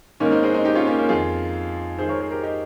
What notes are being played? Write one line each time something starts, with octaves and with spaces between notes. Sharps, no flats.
G#2 D#3 A#3 C#4
C4 D#4
G#3 C4
C4 D#4
D#4 G4
C#4 F4
A#3 C#4
A#3 C#4
F2 D#3 F4 G#4
G#2 D#3 G#4 C5
A#4 C#5
G#4 C5
G4 A#4
D#4 G4